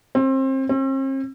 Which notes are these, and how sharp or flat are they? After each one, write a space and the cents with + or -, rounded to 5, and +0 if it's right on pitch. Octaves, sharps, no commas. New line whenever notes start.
C4 +30
C4 +45